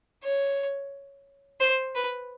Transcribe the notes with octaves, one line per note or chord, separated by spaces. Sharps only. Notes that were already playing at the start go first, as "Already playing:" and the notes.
C#5
C5
B4